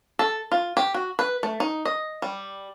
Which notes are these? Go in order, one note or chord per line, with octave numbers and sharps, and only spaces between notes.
A4
F4
G4
F#4
B4
A3
D#4
D#5
G3